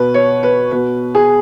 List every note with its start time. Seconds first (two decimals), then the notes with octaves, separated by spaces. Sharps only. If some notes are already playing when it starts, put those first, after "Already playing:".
Already playing: B2 B4
0.14 C#5
0.43 B4
0.71 B2 B4
1.15 G#4